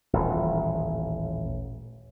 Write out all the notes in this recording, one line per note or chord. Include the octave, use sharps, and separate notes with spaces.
D#1 A1